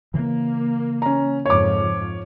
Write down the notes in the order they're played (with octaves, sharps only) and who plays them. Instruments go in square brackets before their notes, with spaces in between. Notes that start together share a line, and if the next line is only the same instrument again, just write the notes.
[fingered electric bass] C#3 E3 [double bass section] A#3
[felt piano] C#4 A#5
[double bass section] F2 G#2 F3 [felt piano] C#5 D6